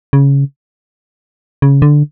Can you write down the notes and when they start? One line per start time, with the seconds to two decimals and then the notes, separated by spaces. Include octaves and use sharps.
0.13 C#3
1.62 C#3
1.82 D3